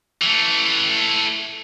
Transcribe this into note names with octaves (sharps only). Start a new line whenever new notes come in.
E3 A3